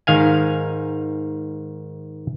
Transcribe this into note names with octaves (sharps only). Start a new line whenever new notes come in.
G#2 D#3 F5 G#5